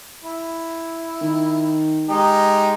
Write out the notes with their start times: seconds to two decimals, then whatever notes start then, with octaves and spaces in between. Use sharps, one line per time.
0.23 E4
1.21 D#3
2.08 G#3 D#4 G4